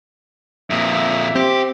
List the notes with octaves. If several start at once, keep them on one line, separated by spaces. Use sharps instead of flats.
F2 A#2 E5
C4 G4